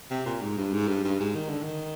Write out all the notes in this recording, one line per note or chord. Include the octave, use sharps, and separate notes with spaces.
C3
A#2
G#2
G2
G#2
G2
G2
G#2
D#3
D3
D#3